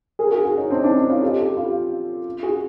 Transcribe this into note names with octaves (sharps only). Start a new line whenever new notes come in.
G#4 A#4
F#4 G#4
F#4 G#4
C#4 D#4
C4 D4
D4 E4
C#4 D#4
D#4 F4
G4 A4
G4 A4
F4 G4
F#4 G#4